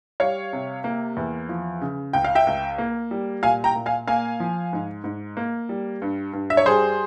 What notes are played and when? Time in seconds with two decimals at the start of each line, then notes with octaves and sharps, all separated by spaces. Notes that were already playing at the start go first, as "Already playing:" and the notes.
0.20 G3 C#5 F5
0.53 C3
0.84 A#3
1.17 E2
1.49 F3
1.81 C#3
2.13 C#2 G5
2.24 F5
2.35 E5 G5
2.47 C#2
2.78 A#3
3.11 G3
3.43 A#2 F5 G#5
3.64 G5 A#5
3.75 A#2
3.86 F5 G#5
4.07 A#3 F5 G#5
4.40 F3
4.73 G#2
5.04 G#2
5.37 A#3
5.69 G3
6.02 G2
6.33 G2
6.50 E5
6.57 C#5
6.66 G3 G#4 C5